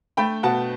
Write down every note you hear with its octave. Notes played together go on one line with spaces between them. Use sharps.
A3 G5 B5
B2 F#5 A5